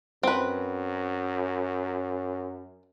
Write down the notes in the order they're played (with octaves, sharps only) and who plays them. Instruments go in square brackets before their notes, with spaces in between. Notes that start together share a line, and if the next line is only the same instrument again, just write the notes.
[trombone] F#2 [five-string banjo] C4 B4